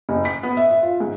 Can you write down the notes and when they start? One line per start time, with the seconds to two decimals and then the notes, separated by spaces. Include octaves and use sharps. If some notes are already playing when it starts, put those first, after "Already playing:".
0.09 F#1
0.25 B6
0.43 B3
0.57 E5
0.71 E5
0.83 F4
1.00 G#2